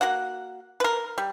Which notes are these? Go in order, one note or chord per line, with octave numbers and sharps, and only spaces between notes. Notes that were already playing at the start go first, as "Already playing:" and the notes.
A#3 F#4 F#5
A#4 B4
G3